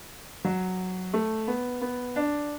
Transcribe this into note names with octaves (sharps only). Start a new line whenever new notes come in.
F#3
A3
B3
B3
D4